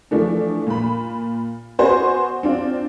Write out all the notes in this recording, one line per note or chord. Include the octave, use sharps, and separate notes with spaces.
E3 F3 A3 D4
A#2 B5
B3 F#4 C5 G#5
C4 D4 F4